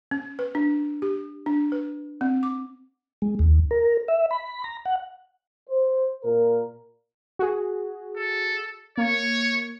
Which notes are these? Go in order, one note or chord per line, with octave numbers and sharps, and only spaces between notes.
C#4
B4
D4
G4
D4
B4
C4
D6
G#3
D#2
A#4
E5
B5
A#5
F#5
C5
A#2 A#4
F#4 G#4
A4
A#3 C#5